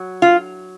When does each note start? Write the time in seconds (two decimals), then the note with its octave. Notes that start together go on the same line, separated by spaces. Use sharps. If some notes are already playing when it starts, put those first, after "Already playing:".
Already playing: F#3
0.22 F4